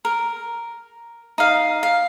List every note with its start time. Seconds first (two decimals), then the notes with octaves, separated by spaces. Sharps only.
0.05 A#4
1.38 D#4 F5
1.83 F5